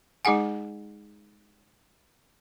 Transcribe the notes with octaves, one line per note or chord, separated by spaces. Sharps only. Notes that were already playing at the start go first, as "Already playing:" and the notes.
G#3 D#4 G#4 F#5 G#5